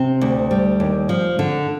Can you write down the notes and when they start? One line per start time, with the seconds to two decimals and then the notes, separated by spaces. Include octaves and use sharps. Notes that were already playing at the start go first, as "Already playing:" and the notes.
Already playing: C3 C4
0.21 D2
0.51 G3
0.80 D#2
1.09 F3
1.39 D3